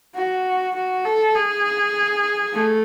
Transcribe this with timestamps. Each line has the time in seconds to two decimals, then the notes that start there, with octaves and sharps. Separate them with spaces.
0.15 F#4
0.75 F#4
1.04 A4
1.34 G#4
2.54 A3